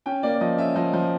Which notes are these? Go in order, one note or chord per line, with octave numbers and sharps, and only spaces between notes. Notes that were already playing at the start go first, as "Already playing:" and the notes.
C#4 G5
A#3 D5
F3 D#5
C#4 E5
F3 D#5
F3